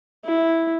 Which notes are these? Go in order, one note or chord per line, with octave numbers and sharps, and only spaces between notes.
E4